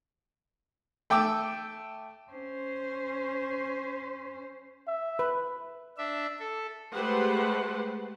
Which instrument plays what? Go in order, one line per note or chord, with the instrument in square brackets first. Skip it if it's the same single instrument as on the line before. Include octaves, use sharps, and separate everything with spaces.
[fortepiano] A3 G5 D6 E6
[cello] C#4 C5
[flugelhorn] E5
[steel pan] B4
[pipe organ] D4 E5
A4
[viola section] G#3 A3 G4 B4 C5 F#5